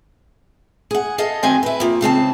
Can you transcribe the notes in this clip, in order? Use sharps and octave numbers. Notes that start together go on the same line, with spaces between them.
G#4 F#5
G#4 A4 D#5 F5
F#2 D#3 C4 D#5 G5 G#5
E4 B4
F3 A#3
G#2 C#3 C4 A5